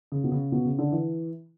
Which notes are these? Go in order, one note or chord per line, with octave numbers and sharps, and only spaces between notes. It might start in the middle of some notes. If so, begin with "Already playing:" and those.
C#3
B2
C#3
B2
C#3
D3
E3